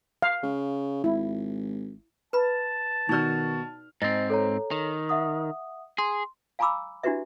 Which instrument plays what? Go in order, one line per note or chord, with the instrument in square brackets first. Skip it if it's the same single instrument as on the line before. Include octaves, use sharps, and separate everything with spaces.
[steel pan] F5
[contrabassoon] C#3
[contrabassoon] G#1 [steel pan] E4
[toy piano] B4 B5 [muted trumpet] A5
[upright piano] B2 F#4 F6 [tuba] D#3 [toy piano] D#4 D5
[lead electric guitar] G#2 C4 [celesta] D#5 A6 A#6
[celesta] A4 C#5 A#5
[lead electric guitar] D#3
[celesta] E5 F#5 D#6
[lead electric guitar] G#4 [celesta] C6
[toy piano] F5 G#5 A#5 B5 D6 E6
D4 E4 F#4 G4 B4 E5